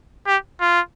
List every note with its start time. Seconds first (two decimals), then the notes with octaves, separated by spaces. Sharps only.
0.27 G4
0.61 F4